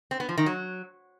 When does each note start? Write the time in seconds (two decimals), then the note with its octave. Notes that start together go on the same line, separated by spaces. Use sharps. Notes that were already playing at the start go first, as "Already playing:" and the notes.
0.11 C4
0.20 B3
0.29 F3
0.38 D#3
0.46 F#3